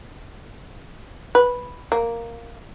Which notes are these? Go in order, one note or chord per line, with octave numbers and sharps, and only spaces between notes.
B4
A#3